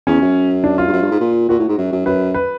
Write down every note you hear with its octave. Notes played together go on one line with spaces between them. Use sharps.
E2 C#4
F#2
D4
F4
G2
F#2
G2
G#2
A#2
A#2 F#4
A2
G#2
F#2
F#2
F#2 B4
B4